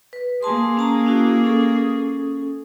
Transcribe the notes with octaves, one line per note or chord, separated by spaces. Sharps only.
B4
A#3 G#4 G#5 A5 C6
C#4 A5 A#5
C#4 E4 F#4
C#4 A4